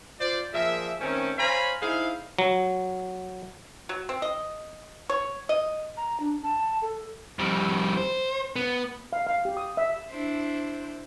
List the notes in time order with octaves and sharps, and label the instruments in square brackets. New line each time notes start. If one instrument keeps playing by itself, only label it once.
[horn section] F4 C5 D5
A#2 F3 G#4 A#4 E5
D#3 A3 C4 C#4
C5 C#5 F5 G#5 A#5 B5
D#4 E4 G#4 C5 F5
[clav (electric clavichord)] F#3
[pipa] F#3
C4
D#5
C#5
D#5
[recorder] A#5
D4
A5
A4
[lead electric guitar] F2 G3
C5
B3
[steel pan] F5
F5
G4
D#6
E5
[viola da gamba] D4 E4 C5